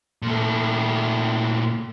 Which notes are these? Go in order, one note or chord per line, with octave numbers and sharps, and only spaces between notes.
A#2 A3